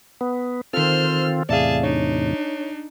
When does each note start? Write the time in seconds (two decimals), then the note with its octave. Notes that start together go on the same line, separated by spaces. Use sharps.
0.21 B3
0.73 D#3 C4 F4 A4 C5 F6
1.49 E2 A2 C3 G#4 D5 E5 F5 A5
1.83 D4 D#4 C#5